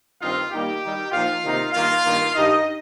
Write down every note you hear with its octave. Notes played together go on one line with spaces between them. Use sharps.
G2 D#3 C4 D#4 F4 F5
D#3 G3 A#3 D#4 G4 G5
D#3 G3 D#4
A#2 F3 A#3 D#4 F4 F5
C3 D#3 A#3 D#4
G2 D#3 A#3 F4 F5
G2 D#3 A#3
G2 D#3 G3 D#4 D#5